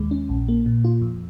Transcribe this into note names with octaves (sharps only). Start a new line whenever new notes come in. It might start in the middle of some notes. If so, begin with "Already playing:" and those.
Already playing: D#2 G#3
C#4
A#1
A#3
A#2
F4
F2